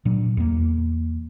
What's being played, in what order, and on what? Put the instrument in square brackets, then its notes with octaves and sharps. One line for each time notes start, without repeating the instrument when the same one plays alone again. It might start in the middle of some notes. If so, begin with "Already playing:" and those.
[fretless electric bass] A#2 F#3 D4
E2 A#3